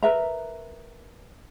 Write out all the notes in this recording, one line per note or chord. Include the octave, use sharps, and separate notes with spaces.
A#4 B4 E5 A#5